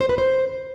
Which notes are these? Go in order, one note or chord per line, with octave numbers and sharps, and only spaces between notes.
C5
B4
C5